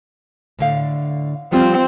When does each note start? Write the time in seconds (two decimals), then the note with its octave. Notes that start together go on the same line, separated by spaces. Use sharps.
0.59 A2 D3 F5
1.52 F3 G3 C4 F4